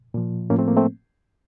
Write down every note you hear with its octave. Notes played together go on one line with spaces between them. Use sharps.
A#2 F3
A2 F3 A#3 C#4
A3 C4
A#3
A3 C4